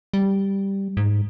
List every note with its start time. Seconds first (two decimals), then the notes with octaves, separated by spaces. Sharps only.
0.14 G3
0.97 G#2